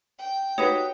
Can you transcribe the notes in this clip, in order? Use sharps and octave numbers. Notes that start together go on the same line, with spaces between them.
G5
D#4 F#4 G4 B4 C#5 C#7